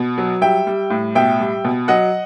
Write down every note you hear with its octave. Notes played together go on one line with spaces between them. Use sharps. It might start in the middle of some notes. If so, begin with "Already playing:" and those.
Already playing: B2
F#3
G3 E5 G5
G3
A2
B2 E5 G5
G3
B2
F#3 D#5 F#5